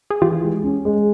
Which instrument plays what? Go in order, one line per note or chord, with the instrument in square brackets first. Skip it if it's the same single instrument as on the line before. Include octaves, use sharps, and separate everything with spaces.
[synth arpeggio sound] G#4
[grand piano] E3 [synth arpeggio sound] F4 G4
[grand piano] G#3
C#4
G#3